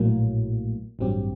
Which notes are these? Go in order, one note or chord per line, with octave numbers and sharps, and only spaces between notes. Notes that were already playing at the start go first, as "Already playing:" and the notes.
Already playing: A#1 A2 F#3 A#3
A1 G2 F#3 C4 G4